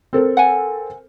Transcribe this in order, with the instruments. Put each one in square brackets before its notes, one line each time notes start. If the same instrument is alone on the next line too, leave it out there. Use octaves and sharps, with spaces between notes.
[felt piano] C4 A4 A#4
[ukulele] F#5 G#5